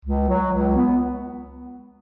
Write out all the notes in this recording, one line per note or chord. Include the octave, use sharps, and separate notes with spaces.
C#2
F#3
C#2
B3